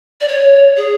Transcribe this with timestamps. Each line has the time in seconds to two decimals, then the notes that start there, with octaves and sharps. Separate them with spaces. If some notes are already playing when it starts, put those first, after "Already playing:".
0.21 D5
0.28 C#5
0.77 G#4